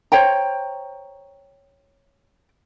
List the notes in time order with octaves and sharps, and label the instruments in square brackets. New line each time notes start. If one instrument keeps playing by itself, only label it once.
[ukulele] C5 C#5 G5 A#5